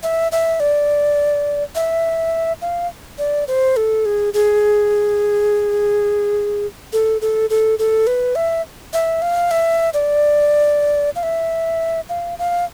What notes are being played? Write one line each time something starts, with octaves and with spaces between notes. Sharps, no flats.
E5
E5
D5
E5
F5
D5
C5
A4
G#4
G#4
A4
A4
A4
A4
B4
E5
E5
F5
E5
D5
F5
E5
F5
F5